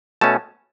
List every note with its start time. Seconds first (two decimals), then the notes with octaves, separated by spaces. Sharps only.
0.21 B2 A3 C#4 A5